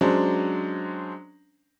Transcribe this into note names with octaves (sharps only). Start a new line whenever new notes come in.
F#3 G#3 C#4 D4 C5